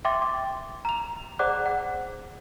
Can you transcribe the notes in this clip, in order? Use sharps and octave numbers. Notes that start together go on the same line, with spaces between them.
E5 G5 C6 D6 A6
D6
A#5 F7
G#4 C5 D5 F#5 D6 F#6
F#5